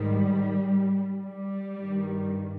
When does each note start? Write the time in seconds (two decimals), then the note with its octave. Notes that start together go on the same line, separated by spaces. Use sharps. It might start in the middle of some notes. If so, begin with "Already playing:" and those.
Already playing: G#2 D#3 G3
1.23 G3
1.79 G2 D#3